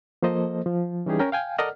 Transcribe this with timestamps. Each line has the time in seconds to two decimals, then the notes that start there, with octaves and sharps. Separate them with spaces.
0.22 F3 A#3 A4 C5 D#5
0.66 F3
1.06 E3 G3 C#4 D#4 G4 G#4
1.19 C#4 A#4 G5
1.32 F5 G5 G#5
1.58 A4 A#4 D5 D#5 F#5 F6